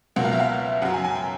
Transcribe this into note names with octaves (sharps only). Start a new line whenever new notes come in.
C#2 B2 F#3 A#3 F#5
F5
E5
F5
F#2 C#3 F#3 F#5
G#5
G#5
G5